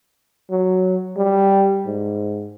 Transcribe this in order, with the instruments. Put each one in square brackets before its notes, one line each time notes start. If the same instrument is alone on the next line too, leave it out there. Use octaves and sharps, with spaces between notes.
[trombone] F#3
G3
G#2